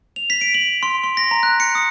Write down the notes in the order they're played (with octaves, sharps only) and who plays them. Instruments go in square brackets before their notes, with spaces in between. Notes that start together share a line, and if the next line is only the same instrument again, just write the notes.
[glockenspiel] F7
B6
D7
F#7
C6
C6
A#6
A#5
F#6
C#7
D#6